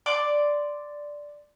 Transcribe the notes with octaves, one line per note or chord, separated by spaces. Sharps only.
D5 C6 D6